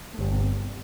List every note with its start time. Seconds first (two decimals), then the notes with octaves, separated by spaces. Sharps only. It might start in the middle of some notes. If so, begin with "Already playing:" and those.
0.13 A3
0.19 G1 G3
0.31 C3